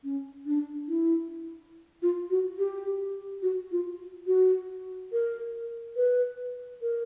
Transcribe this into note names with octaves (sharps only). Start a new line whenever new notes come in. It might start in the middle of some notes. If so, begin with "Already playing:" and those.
C#4
D4
E4
F4
F#4
G4
F#4
F4
F#4
A#4
B4
A#4